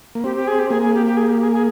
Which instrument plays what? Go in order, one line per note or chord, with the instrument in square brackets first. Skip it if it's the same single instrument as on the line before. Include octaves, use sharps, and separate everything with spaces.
[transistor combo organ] A#3
[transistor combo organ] C4 [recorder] G4
[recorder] G4
G#4
G4
[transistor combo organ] A#3 [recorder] G#4
[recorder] G#4
G4
G4
G#4
G4
G#4
G#4